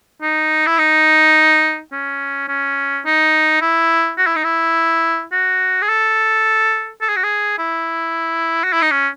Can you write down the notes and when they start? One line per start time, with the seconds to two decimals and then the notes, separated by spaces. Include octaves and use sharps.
0.21 D#4
0.66 E4
0.78 D#4
1.92 C#4
2.48 C#4
3.05 D#4
3.61 E4
4.18 F#4
4.27 E4
4.36 D#4
4.44 E4
5.32 F#4
5.82 G#4
5.89 A4
7.01 A4
7.09 G#4
7.16 F#4
7.23 G#4
7.58 E4
8.64 F#4
8.72 E4
8.82 D#4
8.91 C#4